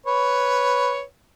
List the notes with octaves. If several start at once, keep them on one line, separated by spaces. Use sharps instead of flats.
B4 C#5